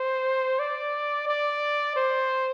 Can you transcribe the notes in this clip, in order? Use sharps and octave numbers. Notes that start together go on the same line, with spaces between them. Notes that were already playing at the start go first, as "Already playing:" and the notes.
Already playing: C5
D5
D5
C5